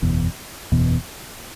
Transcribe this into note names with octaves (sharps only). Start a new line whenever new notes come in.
F#1 E2 B2
F#1 E2 B2